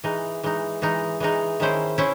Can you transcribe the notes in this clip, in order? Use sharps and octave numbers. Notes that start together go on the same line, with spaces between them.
E3 G#3 D#4
E3 G#3 D#4
E3 G#3 D#4
E3 G#3 D#4
D#3 G#3 C#4 E4 C5
C#4 E4 C5